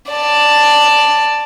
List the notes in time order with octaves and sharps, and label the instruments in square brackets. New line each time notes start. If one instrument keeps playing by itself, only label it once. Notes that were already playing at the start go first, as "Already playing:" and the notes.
[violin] D5 A5